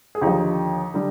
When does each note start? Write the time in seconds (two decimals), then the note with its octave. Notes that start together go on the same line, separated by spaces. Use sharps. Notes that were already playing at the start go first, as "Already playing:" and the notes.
0.15 G#4
0.21 D#2 D3 F3 D#4 G4
0.94 D3 G3